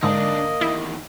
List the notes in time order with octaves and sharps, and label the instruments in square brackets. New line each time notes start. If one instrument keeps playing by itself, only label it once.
[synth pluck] G#2 D3 [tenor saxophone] A#3 [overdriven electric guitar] D4 D#4 [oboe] D#5
[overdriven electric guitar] E2 D#3 [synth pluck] E4